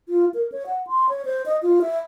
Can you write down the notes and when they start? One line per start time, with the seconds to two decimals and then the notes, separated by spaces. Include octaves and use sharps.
0.09 F4
0.34 A#4
0.52 C#5
0.66 F#5
0.87 C6
1.09 C#5
1.25 C5
1.46 D#5
1.63 F4
1.82 E5